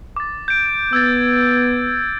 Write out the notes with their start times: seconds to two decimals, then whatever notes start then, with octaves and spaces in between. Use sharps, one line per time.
0.16 D6 A6
0.48 G6 D7
0.93 B3 E6 G#6 A6